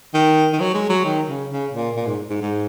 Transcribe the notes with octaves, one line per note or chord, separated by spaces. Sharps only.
D#3
D#3
F#3
G#3
F#3
D#3
C#3
C#3
A#2
A#2
G#2
G#2
G#2